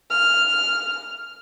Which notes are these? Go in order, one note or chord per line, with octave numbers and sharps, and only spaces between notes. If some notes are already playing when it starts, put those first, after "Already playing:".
F6